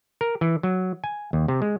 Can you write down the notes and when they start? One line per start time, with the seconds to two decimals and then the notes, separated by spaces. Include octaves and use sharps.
0.21 A#4
0.41 E3
0.63 F#3
1.04 G#5
1.33 D#2
1.48 C3
1.62 G#3